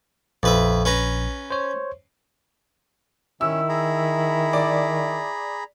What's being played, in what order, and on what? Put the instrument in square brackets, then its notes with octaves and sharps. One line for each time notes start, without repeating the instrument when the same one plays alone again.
[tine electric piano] A#1 [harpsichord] F2 B4 E5
[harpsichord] C#4 B4 A#5
[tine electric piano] C5 C#5
[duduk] D#3 [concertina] C#4 [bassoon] E4 [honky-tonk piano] E6
[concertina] G#4 A#5 B5
[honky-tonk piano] D5